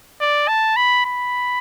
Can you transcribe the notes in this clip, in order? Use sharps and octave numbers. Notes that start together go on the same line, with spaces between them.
D5
A5
B5
B5